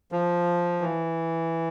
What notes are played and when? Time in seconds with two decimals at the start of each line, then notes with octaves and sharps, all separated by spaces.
0.12 F3
0.81 E3